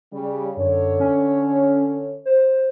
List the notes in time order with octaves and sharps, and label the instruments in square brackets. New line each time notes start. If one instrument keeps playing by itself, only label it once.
[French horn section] C#3 G3
[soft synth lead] F#2 [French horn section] D3 A4 C#5
[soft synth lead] C#4
C5